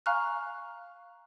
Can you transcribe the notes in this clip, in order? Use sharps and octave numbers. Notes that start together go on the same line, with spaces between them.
F5 G#5 A#5 C#6 F6 F#6